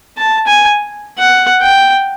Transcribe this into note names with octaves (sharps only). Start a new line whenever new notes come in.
A5
G#5
F#5
G5